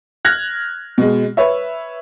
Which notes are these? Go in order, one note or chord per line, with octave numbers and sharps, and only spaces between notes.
F6 F#6 G#6 A#6
B2 G#3
B4 C#5 E5